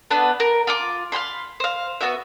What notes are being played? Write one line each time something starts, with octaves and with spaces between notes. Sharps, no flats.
B3 D4 A4 B4
A#4
F4 C6 D6
F5 G5 B5 C6
C5 F5
B3 E4 F#4 E5